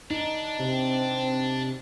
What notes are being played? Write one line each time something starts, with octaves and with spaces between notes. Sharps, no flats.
D4 D#4
C3 C4